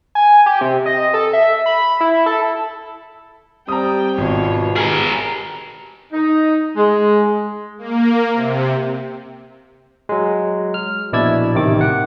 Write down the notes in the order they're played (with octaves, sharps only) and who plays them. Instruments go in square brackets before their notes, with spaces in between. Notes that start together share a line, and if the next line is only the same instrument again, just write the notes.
[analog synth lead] G#5
G4
C3
D#5
A4
E5
B5
E4
A4
[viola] G3 G5 [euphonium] C4 [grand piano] A#5 D#6
[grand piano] G#1 [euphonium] B2 [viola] F4 C#5
[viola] G4 B4 [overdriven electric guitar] G#4 A#4 [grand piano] F6 G#6 F#7
[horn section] D#4
G#3
[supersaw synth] A#3
C3
[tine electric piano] F#3 G#3
F6
A#1 B2 E4 D5 E6 G#6
A1 C3 D#3 D6
F#5